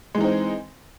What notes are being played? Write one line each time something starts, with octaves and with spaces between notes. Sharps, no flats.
E3 G#3 C4 D#4